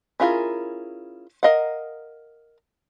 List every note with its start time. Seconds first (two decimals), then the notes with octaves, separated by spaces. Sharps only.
0.20 C#4 E4 F4 G#4 A#4
1.43 A#4 D#5 F5 F#5